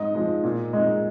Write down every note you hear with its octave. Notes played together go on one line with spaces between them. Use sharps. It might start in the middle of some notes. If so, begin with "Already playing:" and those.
Already playing: G#2 D#5
F3 G#3
A#2
G#3 D#4